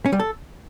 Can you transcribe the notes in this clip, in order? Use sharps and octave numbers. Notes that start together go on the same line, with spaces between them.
C#4
G3
A4